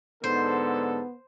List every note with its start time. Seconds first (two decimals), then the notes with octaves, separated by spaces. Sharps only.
0.24 G#2 D3 B3 A4 C5